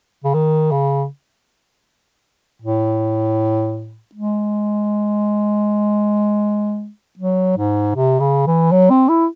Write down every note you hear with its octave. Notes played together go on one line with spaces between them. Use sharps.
C#3
D#3
C#3
A2
G#3
F#3
G#2
C3
C#3
E3
F#3
C4
E4